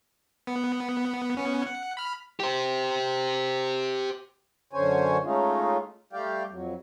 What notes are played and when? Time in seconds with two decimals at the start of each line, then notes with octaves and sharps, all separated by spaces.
0.47 B3
1.37 B3 C#4
1.67 F#5
1.97 B5 F6
2.40 G4 C5
4.73 F#2 D3 C#4 C5 C#5 G#5
5.24 G#3 A3 C#4 D#4 F4
6.13 G3 A3 G4 D5 F5 G5
6.50 F2 F#3